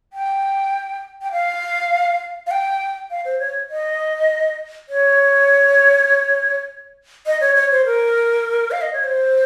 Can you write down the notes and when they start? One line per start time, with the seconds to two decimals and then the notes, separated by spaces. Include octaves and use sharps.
0.13 G5
1.22 G5
1.32 F5
2.47 F5
2.51 G5
3.10 F5
3.25 C5
3.39 C#5
3.70 D#5
4.89 C#5
7.26 D#5
7.41 C#5
7.56 C#5
7.71 C5
7.85 A#4
8.71 F5
8.82 D#5
8.93 C#5
9.04 C5